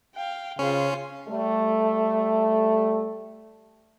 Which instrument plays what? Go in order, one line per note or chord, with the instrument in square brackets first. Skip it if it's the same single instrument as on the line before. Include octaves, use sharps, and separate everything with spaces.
[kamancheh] F5 G5
[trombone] C#3 [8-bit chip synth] C#4 [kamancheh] F4 C5
[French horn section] G3 A3